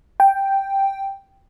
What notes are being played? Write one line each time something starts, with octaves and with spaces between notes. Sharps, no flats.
G5